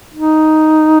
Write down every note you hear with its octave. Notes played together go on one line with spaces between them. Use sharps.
D#4